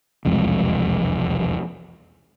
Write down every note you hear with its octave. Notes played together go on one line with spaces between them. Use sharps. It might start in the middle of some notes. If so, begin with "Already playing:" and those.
E1 C2 F2 G#3